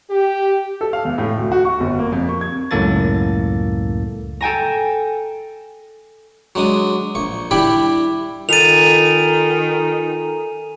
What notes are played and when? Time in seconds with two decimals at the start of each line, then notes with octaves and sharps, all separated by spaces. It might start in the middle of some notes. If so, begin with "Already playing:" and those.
0.11 G4
0.81 A4
0.93 F5
1.05 E2
1.18 A2
1.38 D2
1.52 F#4
1.65 C#6
1.80 G1
1.99 A#3
2.12 F2
2.29 C#6
2.41 G#6
2.71 C#2 F#2 A2 A#3 A4 A6
4.41 A4 G5 G#5 A#5
6.55 F#3 G#3 D4 D#6
7.15 A#1 C#6
7.51 G3 D4 E4 G4 G5 B5
8.49 D#3 F4 A4 G#5 A#5 A6 D#7 F7